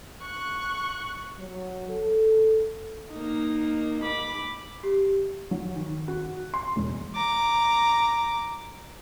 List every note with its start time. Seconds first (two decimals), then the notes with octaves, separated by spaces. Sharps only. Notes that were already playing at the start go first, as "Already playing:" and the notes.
0.22 C#6 F#6
1.38 F#3
1.89 A4
3.12 A#3 D#4
4.04 B5 D6
4.84 G4
5.51 F#3
5.76 D#3
6.08 F#4
6.54 C6
6.76 E1
7.15 A#5 D6